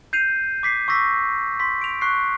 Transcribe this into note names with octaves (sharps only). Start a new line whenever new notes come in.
G6 C7 D#7 F7
D6 B6 C7
C#6 D6 E6 A#6 B6
C6 B6
D7 F7
C#6 F#6 C7